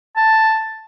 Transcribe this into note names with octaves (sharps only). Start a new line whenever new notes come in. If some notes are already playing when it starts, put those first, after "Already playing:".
A5